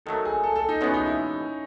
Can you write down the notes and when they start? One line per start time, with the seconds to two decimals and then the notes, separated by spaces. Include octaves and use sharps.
0.06 D#3 F#3 A3 A4
0.25 G#4
0.43 A4
0.56 A4
0.69 D#4
0.81 E2 B2 G#3 B3 C#4
0.94 D#4
1.06 E4